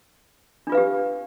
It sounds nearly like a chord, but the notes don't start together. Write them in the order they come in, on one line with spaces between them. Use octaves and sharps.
D4 F4 B4 F5 G4